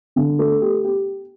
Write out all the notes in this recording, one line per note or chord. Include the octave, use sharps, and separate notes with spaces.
D3
A3
G4
G4